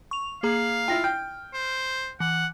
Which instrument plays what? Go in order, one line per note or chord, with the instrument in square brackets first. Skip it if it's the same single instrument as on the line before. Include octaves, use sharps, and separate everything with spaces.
[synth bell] C#6 F7
[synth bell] A#3 G#4 A#5 [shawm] F5
[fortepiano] E4 F4 [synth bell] G5 A#6
[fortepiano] G5 [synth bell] F6
[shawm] C5
[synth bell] E3 [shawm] F#5